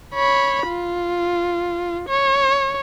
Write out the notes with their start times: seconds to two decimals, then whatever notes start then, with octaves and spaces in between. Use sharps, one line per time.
0.15 C#5 B5
0.68 F4
2.09 C#5